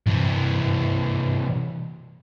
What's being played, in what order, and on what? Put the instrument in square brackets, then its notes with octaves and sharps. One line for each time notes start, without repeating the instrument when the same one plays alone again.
[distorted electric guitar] C3 E3